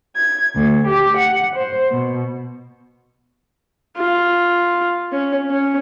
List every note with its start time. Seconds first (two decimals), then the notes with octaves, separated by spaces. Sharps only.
0.14 G#6
0.56 D2
0.88 G4
1.18 F#5
1.56 C5
1.91 B2
3.97 F4
5.12 C#4
5.50 C#4